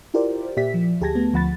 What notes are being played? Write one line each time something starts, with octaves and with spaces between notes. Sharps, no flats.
E4 F4 G4 A#4 C5 D5
A#2 G4 D5 E5 B6
F3
D2 G4 G#4 A5 G#6 A#6
A3 B3
D2 F3 F#5 B5 A6